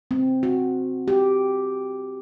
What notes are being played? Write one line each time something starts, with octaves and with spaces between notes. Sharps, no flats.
C4
F#4
G4